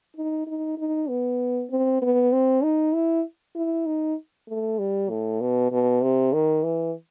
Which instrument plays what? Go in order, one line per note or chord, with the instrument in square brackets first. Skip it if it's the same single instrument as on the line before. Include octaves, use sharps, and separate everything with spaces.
[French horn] D#4
D#4
D#4
B3
C4
B3
C4
D#4
E4
E4
D#4
A3
G3
A2
B2
B2
C3
D#3
E3